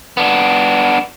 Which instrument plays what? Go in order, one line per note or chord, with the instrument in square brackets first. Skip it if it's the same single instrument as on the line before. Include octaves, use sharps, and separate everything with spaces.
[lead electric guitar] B3 D4